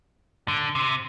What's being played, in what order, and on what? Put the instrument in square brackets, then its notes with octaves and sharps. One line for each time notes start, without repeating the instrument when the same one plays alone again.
[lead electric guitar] D3
C3